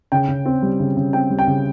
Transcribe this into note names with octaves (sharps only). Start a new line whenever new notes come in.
C#3 G5
C#3
C4
G3
C#3
C#3
C4 G5
G3
G5
C#3